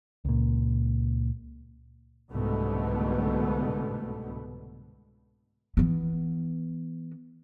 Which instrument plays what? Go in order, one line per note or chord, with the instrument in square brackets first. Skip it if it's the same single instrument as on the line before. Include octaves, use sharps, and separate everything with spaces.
[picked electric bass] C#2 A#2
[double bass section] C2 G#2 B2 D3 A3 B3
[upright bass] E3 B3